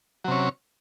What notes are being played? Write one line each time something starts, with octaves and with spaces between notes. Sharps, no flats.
C3 F#3 C#4